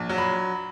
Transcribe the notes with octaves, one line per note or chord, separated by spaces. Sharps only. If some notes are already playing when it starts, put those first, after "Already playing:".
Already playing: A#1
F#3
B5